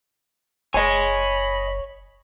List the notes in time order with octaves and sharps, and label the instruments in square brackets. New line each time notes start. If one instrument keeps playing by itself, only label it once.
[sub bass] F#1 [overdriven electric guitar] C#5 [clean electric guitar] D#5 G#5 [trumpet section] B5